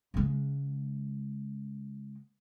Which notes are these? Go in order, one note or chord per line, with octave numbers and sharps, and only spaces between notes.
C#3 G#3